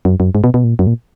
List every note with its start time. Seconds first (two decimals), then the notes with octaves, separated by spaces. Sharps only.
0.05 F#2
0.20 F#2
0.35 G#2
0.44 B2
0.54 B2
0.64 A#2
0.79 F#2
0.87 A#2